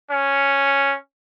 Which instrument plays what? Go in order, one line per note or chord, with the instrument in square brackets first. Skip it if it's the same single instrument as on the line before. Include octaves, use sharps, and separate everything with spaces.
[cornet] C#4